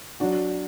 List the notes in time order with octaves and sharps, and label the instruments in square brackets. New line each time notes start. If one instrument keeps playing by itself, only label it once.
[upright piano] F#3 D4 F#4